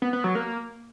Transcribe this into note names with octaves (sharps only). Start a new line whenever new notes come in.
B3
B3
F#3
A#3